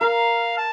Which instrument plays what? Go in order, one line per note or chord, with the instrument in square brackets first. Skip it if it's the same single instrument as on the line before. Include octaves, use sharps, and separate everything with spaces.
[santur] A#4 [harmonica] F5
[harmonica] A5